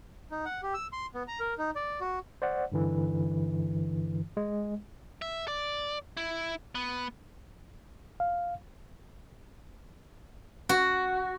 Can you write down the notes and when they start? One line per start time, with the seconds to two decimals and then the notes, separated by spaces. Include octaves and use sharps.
0.31 D#4
0.45 F#5
0.63 G4
0.74 E6
0.92 C6
1.14 B3
1.28 A#5
1.40 A#4
1.58 D#4
1.76 D5
2.01 F#4
2.42 C5 D5 F#5
2.72 G2 D3 E3
4.37 G#3
5.22 E5
5.48 D5
6.17 E4
6.75 B3
8.20 F5
10.69 F#4